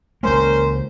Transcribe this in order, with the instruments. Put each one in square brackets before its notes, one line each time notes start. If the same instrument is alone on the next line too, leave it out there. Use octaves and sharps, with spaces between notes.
[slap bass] C#2 G#3 A#3 [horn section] C#4 A#4 C5